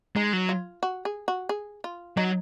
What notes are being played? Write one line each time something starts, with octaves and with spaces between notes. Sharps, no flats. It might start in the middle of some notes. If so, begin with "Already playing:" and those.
G#3 D#4
F#3
F4
F#4
G#4
F#4
G#4
F4
F#3 D#4